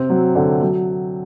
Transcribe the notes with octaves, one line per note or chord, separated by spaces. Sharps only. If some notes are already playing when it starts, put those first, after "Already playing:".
Already playing: C3 C4
F#3
D3
F#3